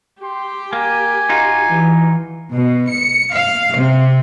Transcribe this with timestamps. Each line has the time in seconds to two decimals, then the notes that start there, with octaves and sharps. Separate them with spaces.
0.22 G4 G5 C6
0.73 A#3 G#5
1.29 D#4 F4 F#4
1.66 E3
2.52 B2
2.88 C#7
3.33 F5
3.75 C3